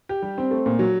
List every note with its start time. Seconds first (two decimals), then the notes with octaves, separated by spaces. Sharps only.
0.09 G4
0.22 G3
0.38 C4
0.51 A3
0.66 A#2
0.79 F#3